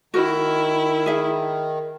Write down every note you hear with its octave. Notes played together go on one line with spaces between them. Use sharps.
D#3 E4 F#4 A#4
G#4 E5